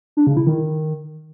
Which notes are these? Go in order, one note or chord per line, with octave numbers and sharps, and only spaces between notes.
D4
C#3
E4
D#3